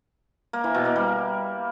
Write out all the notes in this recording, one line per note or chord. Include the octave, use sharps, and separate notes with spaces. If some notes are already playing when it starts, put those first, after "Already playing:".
A#3
E3
B2
A#3
G3